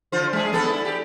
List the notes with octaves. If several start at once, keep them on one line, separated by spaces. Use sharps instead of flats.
D3 F4 C5
G#3 G#4
B3 D4 A4
E4
G4